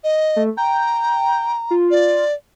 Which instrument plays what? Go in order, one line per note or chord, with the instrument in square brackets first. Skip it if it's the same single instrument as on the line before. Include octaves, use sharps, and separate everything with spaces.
[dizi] D#5
[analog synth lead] A3
[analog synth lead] G5 [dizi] A#5
[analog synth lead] F4
[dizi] D5